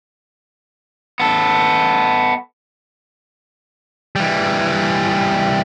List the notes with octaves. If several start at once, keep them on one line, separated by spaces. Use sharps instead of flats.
B3 A4
E3 G3